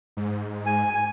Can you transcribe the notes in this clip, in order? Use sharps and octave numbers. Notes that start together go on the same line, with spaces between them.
G#2
G#5
G#5